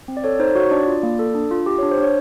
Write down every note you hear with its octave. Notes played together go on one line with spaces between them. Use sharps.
C4
D5
A4 C#5
D#4 C5
F#4 C#5
D4 D5
F4
A#3
A4
D4
F4
G4
D4 C#5
C5
D4 C#5